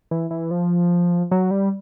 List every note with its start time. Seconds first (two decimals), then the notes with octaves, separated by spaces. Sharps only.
0.11 E3
0.31 E3
0.51 F3
1.31 F#3
1.51 G3